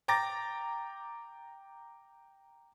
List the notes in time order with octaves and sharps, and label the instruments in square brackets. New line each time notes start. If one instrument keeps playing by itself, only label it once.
[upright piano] G5 A#5 D6 A6 A#6